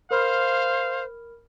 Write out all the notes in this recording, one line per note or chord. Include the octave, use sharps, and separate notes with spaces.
A#4 C5 F5 B5 F6